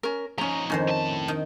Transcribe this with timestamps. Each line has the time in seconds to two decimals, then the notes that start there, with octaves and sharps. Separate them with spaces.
0.03 C#4 A#4
0.38 F3 C#4 D#4 A#5
0.70 F2 D#3 C#4 C5
0.88 A2 A5
1.28 D#3